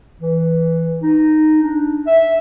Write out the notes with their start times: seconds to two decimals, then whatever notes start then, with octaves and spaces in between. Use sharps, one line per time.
0.22 E3
1.03 D#4
1.62 D4
2.07 E5